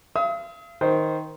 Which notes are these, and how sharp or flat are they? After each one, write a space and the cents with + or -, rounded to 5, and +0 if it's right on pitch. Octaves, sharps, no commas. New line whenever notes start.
F5 -45 D#6 +40
D#3 +10 C5 +0